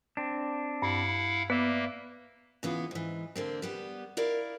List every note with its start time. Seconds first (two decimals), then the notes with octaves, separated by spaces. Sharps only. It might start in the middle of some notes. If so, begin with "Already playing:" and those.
0.17 C4 D4
0.82 G2 E4 F5 F#5
1.50 A#3 B3 B4 D5 E5
2.63 C#3 E3 B3 F4
2.91 G#2 E3
3.36 D3 A#3 C4
3.62 G3 B3 G4
4.17 E4 A#4 D5 F5